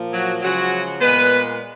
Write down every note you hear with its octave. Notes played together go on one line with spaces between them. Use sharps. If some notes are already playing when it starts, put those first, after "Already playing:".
Already playing: A#2 F3 A#3
F#3 F#4
C#3 F3 F#3 G#3 F#4
A#2 G#3 B3 B4